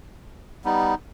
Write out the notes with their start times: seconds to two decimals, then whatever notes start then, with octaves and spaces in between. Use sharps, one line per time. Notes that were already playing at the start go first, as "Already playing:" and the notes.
0.64 G3 B3 D#4